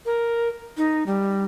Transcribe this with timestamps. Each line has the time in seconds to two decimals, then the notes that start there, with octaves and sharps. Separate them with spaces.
0.06 A#4
0.77 D#4
1.06 G3